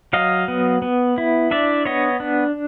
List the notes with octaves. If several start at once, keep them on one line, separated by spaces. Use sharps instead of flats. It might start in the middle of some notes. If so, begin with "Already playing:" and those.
F#3 D#5 F5
B3
B3
E4
D4 D5 E5
B3 C#5 D#5
D4